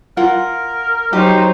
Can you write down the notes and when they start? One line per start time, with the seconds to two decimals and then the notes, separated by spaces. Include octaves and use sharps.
0.17 F4 A#4 F#5
1.13 F#3 D#4 G4 C5